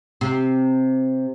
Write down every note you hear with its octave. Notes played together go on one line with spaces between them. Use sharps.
C3